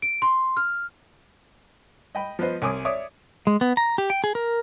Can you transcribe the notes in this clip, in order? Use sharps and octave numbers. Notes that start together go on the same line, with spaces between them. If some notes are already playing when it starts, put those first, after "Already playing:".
D7
C6
F6
D#5 G5 B5
F3 B3 B4 C5 D#5
C2 C#5 G#5 D6 D#6
C#5 D5 E5 D6 D#6
G#3
B3
A#5
G4
G5
G#4
A#4